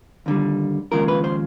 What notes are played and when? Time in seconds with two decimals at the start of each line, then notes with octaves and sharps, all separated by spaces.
0.26 D#2 D3 G3
0.92 D#2 C#3 F3 G#3 A#4
1.08 B4
1.24 C5